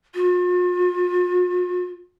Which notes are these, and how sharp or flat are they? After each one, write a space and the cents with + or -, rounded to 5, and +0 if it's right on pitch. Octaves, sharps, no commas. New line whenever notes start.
F4 +45